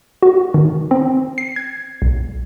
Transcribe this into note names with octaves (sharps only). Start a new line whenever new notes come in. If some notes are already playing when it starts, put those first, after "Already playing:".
F#4
D#3
C4
C7
G#6
B1